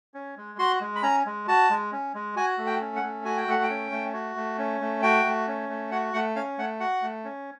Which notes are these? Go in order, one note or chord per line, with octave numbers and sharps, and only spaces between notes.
C#4
G#3
F#4 C6
G#3
B5
C#4 A#5
G#3
F#4 A5
G#3
C#4
G#3
F#4 G#5
A3
G5
C#4
F#5
A3
F#4 G#5
G5
A3 F#5
G5
C#4
A3
F#4
A3
C#4
A3
F#4 G5
A3
C#4
A3
F#4 F#5
A3 F#5
C#4 F5
A3 F#5
F#4 F#5
A3
C#4